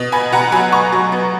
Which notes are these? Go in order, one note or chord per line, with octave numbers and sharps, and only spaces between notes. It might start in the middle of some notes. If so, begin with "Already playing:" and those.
Already playing: B2
B3 G#5 B5
B2 F#5 A#5
F#3 G#5 B5
B3 A#5 C#6
F#3
B3